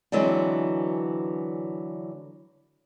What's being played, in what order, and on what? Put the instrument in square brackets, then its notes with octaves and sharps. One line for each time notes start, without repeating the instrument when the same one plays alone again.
[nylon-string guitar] D3 E3 F#3 G#3 C4